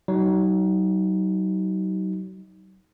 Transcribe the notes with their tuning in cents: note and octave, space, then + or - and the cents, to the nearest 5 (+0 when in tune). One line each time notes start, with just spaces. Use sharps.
F#3 +35 D#4 +15